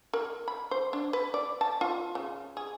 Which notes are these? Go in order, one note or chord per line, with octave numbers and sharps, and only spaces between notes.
A#4
B5
C5
D4
B4
D5
A5
F4
C#3
G#4